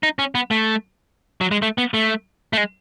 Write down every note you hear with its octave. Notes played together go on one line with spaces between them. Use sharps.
D#4
C#4
B3
A3
F#3
G#3
A3
B3
A3
A3
G#3